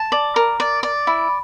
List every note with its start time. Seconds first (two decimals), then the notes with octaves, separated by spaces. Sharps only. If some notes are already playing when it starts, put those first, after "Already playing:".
Already playing: A5
0.12 D5
0.36 A#4
0.60 D5
0.83 D5
1.07 E4